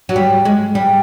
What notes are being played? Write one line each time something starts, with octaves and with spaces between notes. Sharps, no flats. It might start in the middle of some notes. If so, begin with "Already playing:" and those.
F#3
G3
G#3
G3